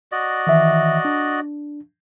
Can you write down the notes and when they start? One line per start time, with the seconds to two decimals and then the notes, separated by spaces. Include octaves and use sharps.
0.12 F#4 D5 D#5
0.47 D#3 E3 E5
1.05 D4